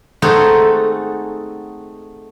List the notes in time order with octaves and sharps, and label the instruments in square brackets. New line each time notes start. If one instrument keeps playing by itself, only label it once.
[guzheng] A3 C4 D#4 F#4 G#4 A4